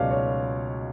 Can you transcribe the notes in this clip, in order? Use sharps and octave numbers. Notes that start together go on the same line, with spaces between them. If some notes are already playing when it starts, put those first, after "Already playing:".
Already playing: C#2 B2 F#3 C#5 D5 F5
C#5